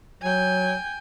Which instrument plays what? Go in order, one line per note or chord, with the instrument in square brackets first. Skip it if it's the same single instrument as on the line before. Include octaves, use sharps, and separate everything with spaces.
[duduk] F#3 [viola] G5 G#5